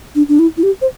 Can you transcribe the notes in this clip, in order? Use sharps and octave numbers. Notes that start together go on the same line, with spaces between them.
D4
D4
E4
E4
G4
C5